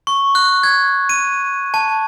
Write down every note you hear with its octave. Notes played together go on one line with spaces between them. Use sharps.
C#6
F#6
G#6
D#7
A5